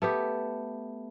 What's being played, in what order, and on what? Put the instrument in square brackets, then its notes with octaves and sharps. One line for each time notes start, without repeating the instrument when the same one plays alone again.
[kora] A3 B3 G4